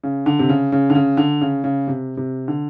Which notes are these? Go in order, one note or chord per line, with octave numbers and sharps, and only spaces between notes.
C#3
D3
C3
C#3
C#3
D3
C#3
D3
C#3
C#3
C3
C3
D3